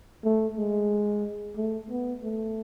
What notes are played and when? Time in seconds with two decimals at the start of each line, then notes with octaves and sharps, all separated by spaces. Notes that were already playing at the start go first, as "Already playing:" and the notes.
0.24 A3
0.58 G#3
1.57 A3
1.90 B3
2.23 A3